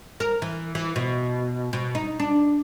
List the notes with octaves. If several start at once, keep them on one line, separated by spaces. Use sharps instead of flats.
A#4
E3
E3
B2
B2
D#4
D4